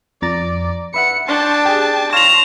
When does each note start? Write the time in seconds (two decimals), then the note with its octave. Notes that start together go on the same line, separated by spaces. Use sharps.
0.22 F2 D5 A#5 A6
0.94 B4 E5 F#5 C#7
1.28 D4 G5 A5 C6 C#6 G6
1.65 G4 G#4
2.13 C#5 F5 A5 C6 A#6 E7 F7